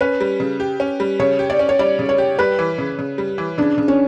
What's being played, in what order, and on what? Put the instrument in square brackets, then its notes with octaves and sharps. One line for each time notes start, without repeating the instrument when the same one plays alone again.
[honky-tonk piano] C#4 [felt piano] B4
[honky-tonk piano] G3
C#3
G4
C#4
G3
[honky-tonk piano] C#3 [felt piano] C#5
[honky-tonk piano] G4
[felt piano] D5
[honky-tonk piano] C#4
[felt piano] C#5
[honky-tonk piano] G3 [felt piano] D5
[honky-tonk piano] C#3
[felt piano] C#5
[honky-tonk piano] G4
[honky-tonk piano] G3 [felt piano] B4
[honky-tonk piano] E3
C#3
C#3
G3
E3
[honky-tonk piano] C#3 [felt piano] D4
[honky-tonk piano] C#3
[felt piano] C#4